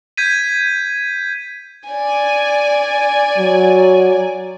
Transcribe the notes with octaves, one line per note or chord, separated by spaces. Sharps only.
G6 G#6 B6 D#7
D5 G#5
F#3